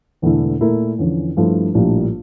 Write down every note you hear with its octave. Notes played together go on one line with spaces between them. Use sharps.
E1 E2 D3 A3 E4
A#2 A3 E4 A#4
E2 D3 F3 C#4
G2 F3 A3 E4
A#1 A2 G3 A#3 D4